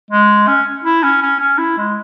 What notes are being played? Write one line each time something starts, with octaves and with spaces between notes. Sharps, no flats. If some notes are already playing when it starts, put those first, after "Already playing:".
G#3
C#4
E4
C#4
C#4
C#4
E4
G#3